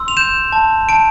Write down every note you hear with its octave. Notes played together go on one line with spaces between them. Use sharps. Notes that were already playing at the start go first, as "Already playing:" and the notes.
Already playing: C6 E6
F7
G6 E7
A5
A5 D7